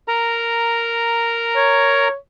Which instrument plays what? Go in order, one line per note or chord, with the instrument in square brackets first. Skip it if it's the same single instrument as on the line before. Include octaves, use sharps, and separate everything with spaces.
[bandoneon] A#4 A#5
[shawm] C#5